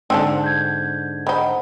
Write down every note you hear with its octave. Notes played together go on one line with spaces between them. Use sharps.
G#2 D3 C4 G#5 A5
G6 G#6
D#3 D#4 C5 F#5 B5